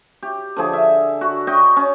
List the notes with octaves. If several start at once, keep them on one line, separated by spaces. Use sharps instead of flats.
G4
D3 F3 G#4
E5
F#4
D#5 G5 C#6
C#4